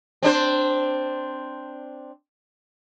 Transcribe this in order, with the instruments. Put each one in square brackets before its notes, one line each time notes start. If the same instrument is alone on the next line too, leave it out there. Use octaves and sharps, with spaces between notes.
[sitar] C4 D4 C5